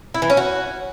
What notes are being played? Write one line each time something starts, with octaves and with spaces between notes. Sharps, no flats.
E4
E3
C#4
F#4